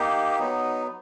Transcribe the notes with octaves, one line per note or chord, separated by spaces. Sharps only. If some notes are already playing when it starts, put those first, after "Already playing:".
Already playing: A#3 D#4 G4
F#3 B3 D#4